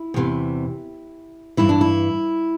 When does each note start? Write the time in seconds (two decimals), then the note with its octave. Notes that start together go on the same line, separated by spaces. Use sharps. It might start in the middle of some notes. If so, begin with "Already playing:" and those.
Already playing: E4
0.14 E2 C3 E3
1.57 G2 E3 E4
1.69 D4
1.81 E4